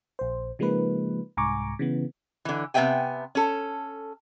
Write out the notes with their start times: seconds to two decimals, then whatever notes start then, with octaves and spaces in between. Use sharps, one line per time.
0.19 A#1 C5
0.59 C#3 F3 G#3 A#3 D#4 B4
1.37 C2 G#2 G#5 A#5 C#6 D6
1.79 C#3 E3 B3
2.45 D3 E3
2.74 C3 B3 D5 E5 G5 G#5
3.35 C#4 A4